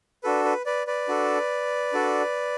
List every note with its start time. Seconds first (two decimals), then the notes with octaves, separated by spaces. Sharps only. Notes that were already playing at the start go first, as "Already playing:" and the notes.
0.23 D4 F#4 A4 B4
0.45 B4
0.66 B4 D5
0.87 B4 D5
1.08 D4 F#4 A4
1.93 D4 F#4 A4